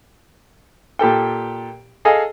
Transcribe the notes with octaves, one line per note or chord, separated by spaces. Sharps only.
A#2 G4 A4 G5
G#4 A4 D#5 F5 G#5